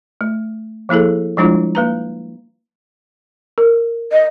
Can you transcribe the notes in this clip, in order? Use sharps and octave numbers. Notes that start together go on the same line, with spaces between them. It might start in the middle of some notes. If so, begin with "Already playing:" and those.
A3
F3 A#3 E4 G#4 A4
F3 G3 G#3 D4 E4 F4
A#3 B4 A#5
A#4
D#5